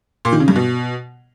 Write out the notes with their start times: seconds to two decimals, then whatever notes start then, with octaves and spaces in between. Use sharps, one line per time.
0.25 A#2
0.33 D#3
0.40 C#3
0.48 G2
0.56 B2